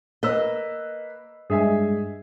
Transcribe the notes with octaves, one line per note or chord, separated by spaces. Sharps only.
A#3 B4 D#5 E6
G2 G#3 G#4 E5 G#5